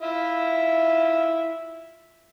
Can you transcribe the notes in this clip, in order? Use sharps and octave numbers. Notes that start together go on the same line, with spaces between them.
E4 F4 E5